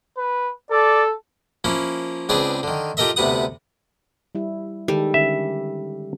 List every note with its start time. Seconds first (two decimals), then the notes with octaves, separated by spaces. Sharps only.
0.17 B4
0.71 A4 D5
1.64 F3 A#3 C#4 E4
2.29 C#2 C4 D4 G#4 B4 D5
2.63 D3 D#3
2.97 F4 G4 A4 A#4 D#5 E5
3.16 D2 C3 B3 F#5 D#6
4.35 G3 E4
4.88 D#3 G3 G#3 A4
5.14 D3 C#4 E5